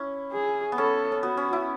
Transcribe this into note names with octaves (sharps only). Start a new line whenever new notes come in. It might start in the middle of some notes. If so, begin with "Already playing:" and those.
Already playing: C#4 E4
G#4
B3
C#4 A4
C#4
B3 F#4
C#4
E4